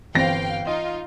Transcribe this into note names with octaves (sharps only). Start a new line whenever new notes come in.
G1 E3 C4 F5 G5 A#6
D#4 F4 D#5